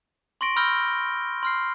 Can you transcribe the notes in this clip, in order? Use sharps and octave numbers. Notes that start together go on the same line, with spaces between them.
C6 C#6 A#6 D7
B5 E6 F6 G6 A#6 G7
C6 F6 C7